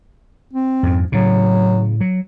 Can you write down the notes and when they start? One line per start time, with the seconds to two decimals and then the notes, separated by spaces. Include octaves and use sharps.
0.53 C4
0.83 F2 G#2
1.12 A2 C#3 F#3
2.01 F#3